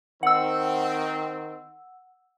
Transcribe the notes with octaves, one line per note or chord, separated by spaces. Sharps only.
D#3 C4 F#5 E6